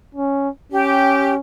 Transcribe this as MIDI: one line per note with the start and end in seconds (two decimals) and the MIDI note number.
0.15 0.49 61
0.72 1.40 61
0.72 1.34 67